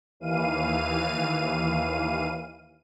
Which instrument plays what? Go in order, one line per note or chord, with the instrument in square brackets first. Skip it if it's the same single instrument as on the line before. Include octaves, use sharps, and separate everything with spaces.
[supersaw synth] D#2 E3 F5 D#7